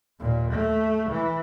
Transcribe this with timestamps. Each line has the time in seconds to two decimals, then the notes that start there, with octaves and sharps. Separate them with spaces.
0.20 D#2 A#2
0.52 A3
1.10 E3